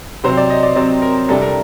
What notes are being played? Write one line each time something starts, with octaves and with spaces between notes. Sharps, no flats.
C3 F#3 C4 C5
D5
D#5
D5
C3 F#3 C4 D5
A#4
C2 C3 G3 D4 A4
A#4